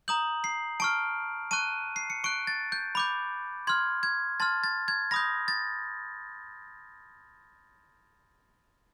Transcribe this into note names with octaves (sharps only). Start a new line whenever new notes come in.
A#5 D#6 G6 F#7
C7
A5 C#6 F6 D7
A5 C#6 F#6 D#7
C7
C#7
C#6 F#6 D7
A6
G6
B5 D6 G6
C6 F6 G#6
G#6
A5 C6 F6 A6
A6
G#6
B5 D#6 G6 A#6
A6